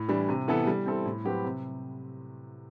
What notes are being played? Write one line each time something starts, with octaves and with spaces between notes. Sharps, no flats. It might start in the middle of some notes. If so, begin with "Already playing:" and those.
Already playing: A2
E3 G3 D4
C3
E3 B3 E4 A4
G3
C4 E4 A4
A2
F#3 C4 G4 B4
C3